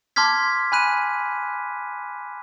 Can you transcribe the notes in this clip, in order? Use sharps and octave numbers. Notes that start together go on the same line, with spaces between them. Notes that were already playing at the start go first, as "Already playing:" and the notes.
A5 C6 D6 F6 G#6 B6
G#5 B5 F#6 D#7